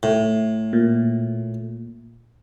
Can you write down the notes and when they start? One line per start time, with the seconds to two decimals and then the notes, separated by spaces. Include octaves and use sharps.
0.03 A2
0.73 A#2